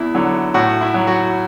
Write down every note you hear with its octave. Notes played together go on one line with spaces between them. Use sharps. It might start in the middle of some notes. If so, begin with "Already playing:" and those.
Already playing: E2 E4
D3 F#3
A2 F#4
E4
F#3
F#4